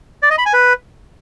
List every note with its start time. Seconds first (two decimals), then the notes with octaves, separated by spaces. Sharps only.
0.23 D5
0.30 D#5
0.38 B5
0.46 G#5
0.53 B4